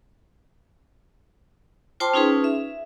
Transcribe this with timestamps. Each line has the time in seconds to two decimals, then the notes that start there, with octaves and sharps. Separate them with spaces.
2.00 F4 C5 G5 A5 C6 D6
2.14 C#4 D#4 F4 G#4 B4
2.44 E5